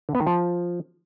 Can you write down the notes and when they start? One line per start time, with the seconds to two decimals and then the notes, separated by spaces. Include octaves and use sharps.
0.09 D3
0.15 B3
0.21 D#3
0.27 F3